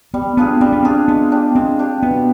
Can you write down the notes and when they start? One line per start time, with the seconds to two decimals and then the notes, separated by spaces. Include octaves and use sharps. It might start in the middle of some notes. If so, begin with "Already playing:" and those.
0.14 G3 B3
0.37 B3 D4 F4 G#4
0.61 G3 C4
0.72 B3
0.83 C4 D4 F4 G#4
1.08 G#3 B3
1.32 D4 G4
1.55 G#3 C4
1.79 D4 G4
2.03 B2 B3